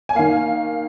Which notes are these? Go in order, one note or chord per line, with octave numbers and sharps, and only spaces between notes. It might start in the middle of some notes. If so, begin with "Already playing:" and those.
G#5
D#3 A#3 F5